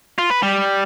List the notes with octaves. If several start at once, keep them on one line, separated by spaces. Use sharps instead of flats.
F4
B4
G3